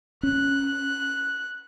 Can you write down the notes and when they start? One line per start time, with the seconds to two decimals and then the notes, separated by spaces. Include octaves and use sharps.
0.23 C#4 F#6